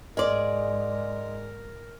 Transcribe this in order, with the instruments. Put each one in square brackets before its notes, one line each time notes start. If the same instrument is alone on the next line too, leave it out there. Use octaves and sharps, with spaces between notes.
[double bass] G#2 [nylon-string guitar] G#4 D5 [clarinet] A#4 [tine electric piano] D#5 C6